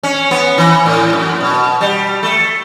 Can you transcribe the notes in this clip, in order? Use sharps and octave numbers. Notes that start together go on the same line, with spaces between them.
C#4
B3
E3
A2
F#2
B2
G3
A3